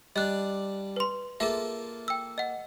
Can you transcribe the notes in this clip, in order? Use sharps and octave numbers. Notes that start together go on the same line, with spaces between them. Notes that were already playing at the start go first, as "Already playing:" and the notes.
G3 D4 D#5 F#6
B4 C6
A#3 F4 G#4 A4 E5
G5 E6
D#5 F#5